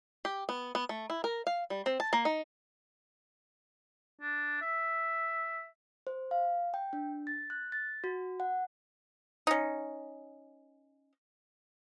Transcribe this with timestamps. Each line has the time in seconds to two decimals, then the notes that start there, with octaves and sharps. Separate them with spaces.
0.25 G4
0.49 B3
0.75 B3
0.89 A3
1.10 E4
1.24 A#4
1.47 F5
1.70 G3
1.86 C4
2.00 A5
2.13 A#3
2.25 D#4
4.21 D4
4.62 E5
6.07 C5
6.31 F5
6.74 G5
6.93 D4
7.27 A6
7.50 F#6
7.72 A6
8.04 F#4
8.40 F#5
9.47 C#4 D#4